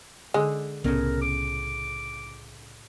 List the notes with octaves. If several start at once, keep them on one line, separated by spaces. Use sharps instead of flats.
D3 G#3
C2 A2 C#3 B3 C#4 A#4
D6